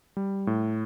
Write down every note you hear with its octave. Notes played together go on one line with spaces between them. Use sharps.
G3
A2